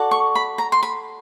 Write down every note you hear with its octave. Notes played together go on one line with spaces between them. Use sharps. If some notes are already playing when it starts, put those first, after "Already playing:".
Already playing: F#4 A4 D5
C#6
B5
A#5
C6
B5